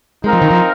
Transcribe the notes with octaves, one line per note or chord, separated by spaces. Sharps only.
G#3 C4 D#4 A#4 F5
F3
D#3
F3